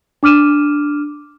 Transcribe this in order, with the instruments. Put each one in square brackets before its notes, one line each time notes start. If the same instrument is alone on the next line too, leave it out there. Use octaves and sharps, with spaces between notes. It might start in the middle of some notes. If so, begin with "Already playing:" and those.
[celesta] D4 D6 F6 D#7 E7